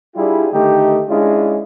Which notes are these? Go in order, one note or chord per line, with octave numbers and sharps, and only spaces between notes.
G3 D4 E4 F4 G4 G#4
D3 D#3 A3 D#4 G4
G#3 C#4 D4 E4 F4 G#4